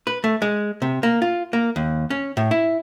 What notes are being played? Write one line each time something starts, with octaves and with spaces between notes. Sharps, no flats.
B4
A3
G#3
C3
A#3
F4
A#3
D#2
C#4
A2
E4